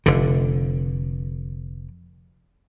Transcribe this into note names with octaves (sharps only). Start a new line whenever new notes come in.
F1 D3